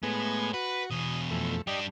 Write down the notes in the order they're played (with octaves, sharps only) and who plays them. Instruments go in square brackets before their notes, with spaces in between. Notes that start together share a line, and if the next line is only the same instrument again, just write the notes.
[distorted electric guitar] A2 [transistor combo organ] G#3 B3 G#5
[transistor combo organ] F#4 [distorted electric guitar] B4
[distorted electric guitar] E2 B2 [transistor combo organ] D#6
[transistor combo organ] F2 A3
[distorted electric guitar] G3 D4 [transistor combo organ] G4 D5 D#5